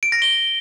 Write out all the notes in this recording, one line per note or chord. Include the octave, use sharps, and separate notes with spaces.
D7
A#6
G7